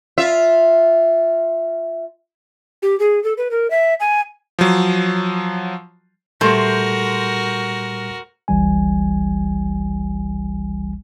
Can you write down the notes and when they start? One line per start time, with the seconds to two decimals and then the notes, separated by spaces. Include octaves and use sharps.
0.18 F4 E5
2.83 G4
3.00 G#4
3.24 A4
3.38 B4
3.51 A#4
3.70 E5
4.00 G#5
4.59 F3 F#3
6.41 A#2 G3 A3 F#4 G4 A#4 C5 C6
8.48 G1 C#2 E3 G3 G#5